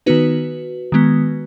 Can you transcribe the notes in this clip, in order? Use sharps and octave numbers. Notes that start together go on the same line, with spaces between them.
D#3 B3 D#4 F#4 B4
D#3 G#3 B3